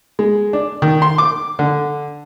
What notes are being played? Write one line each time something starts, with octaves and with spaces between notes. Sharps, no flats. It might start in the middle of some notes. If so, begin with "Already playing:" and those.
G#3
D4
D#3
C6
D6
D3